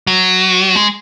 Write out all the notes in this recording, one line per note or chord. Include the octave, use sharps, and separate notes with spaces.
F#3
G#3